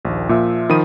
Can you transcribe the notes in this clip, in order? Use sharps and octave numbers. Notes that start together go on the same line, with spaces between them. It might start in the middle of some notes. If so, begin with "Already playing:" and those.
A#1 D#2
A#2 F3 F4 E5
D#3 F3 B5 D#6 D#7